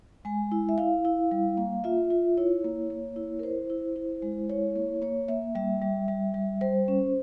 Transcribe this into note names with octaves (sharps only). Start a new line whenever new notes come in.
G#3 G#5
E4
E5
E4 F5
E4
G3
A#3
F4 E5
F4
E4 C#5
A#3
A#3
E4
A#4
E4 C5
E4
E4
G#3
E4 C#5
A#3
A#3 C#5
A#3 E5
G3 E5
G3
G3
G3
G3 C5
C#4